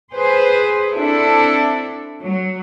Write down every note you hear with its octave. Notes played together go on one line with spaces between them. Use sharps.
G#4 B4 C5
C4 D4 E4 A4
F#3